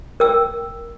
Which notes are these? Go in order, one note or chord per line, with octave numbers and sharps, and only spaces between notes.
A#4 G5 E6